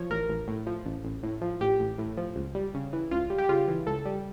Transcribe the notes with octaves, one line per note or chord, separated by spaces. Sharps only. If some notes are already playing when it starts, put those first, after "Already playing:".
Already playing: F3 C#5
A1 A#4
A1
A2
F3
A1
A1
A2
F3
A1 G4
A1
A2
F3
C#2
G3
C#3
E3
C#2 F4
G3
G4
C#3 F4
E3
C#2 A4
G3